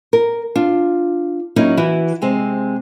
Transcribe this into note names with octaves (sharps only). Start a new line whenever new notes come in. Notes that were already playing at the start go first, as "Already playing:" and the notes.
A#4
D4 F4
F#3 A#3 C#4 D#4 E4
E3 E4 F#4
C3 G#3 C4